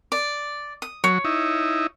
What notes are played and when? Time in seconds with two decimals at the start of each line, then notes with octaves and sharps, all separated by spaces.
0.12 D5
0.82 D#6
1.04 F#3 C#5
1.25 D#4 E4